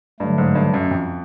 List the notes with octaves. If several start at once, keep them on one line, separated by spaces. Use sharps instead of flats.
G2 D3 F#3 A3
G#2
G2
F#2
F2